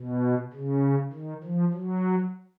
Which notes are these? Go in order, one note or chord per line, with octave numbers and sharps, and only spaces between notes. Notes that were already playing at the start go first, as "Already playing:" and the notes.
Already playing: B2
C#3
D#3
F3
F#3